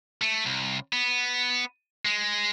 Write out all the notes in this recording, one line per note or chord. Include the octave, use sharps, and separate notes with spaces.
A3
C2
B3
G#3